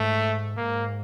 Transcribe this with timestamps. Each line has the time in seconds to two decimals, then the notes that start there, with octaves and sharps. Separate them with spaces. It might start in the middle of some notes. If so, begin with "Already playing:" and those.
Already playing: G#2 A3
0.57 G#2 A#3